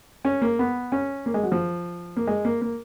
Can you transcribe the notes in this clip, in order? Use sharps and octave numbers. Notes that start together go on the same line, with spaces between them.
C#4
A#3
B3
C#4
A#3
G#3
F#3
F3
A#3
G#3
A#3
A#3